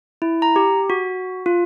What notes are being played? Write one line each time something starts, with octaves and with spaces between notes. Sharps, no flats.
E4
A#5
G4
F#4
F4